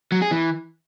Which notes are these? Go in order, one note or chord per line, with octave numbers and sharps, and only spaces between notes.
F#3
G#4
E3